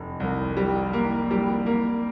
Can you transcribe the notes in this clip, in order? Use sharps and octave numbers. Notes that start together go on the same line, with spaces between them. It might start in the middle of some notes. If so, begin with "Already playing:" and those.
Already playing: F1
C2
G3
A#3
G3
A#3